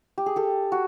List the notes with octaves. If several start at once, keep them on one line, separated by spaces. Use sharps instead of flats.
G4
G#4
G4 A4
F#4